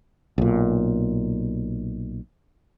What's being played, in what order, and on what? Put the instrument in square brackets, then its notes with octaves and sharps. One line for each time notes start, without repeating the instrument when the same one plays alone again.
[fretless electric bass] B1 A#2